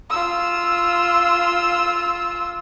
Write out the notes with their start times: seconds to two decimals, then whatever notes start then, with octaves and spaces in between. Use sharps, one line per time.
0.10 F4 E6